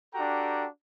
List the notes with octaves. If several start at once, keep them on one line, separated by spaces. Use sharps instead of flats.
D4 F#4 G4 A4 G5 A#5